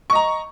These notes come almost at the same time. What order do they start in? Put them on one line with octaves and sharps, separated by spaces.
C#6 D#5 A#5